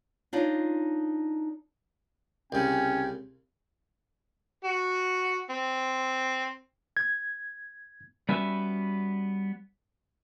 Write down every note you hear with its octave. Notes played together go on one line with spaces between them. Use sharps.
D4 D#4 F4 C#5 D5
C2 C#3 C#4 G5
F#4
C4
G#6
G3 B3 C#4 F#4 B4 E5